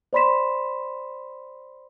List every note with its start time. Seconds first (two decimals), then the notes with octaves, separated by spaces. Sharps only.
0.13 C5 D5 B5 C6 B6 E7